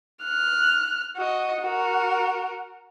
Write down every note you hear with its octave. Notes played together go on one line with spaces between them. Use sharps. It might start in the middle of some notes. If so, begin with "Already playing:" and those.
F6 F#6
F#4 D#5
F#4 A#4